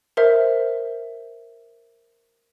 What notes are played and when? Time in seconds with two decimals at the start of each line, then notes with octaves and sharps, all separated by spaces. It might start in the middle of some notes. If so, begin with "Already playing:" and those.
0.17 A#4 C5 E5